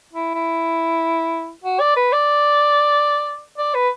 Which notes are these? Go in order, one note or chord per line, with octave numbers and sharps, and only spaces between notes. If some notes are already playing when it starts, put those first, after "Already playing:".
E4
E4
F#4
D5
B4
D5
D5
B4